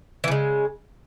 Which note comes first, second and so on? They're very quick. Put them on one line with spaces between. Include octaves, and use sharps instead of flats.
E3 C#3 G#3